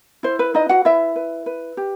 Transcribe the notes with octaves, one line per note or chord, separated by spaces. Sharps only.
E4 C5
B4
D#4 B4 D#5
F#4 F#5
E4 B4 E5
B4
B4
G4